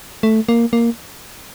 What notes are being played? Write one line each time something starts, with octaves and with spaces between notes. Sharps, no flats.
A3
A#3
A#3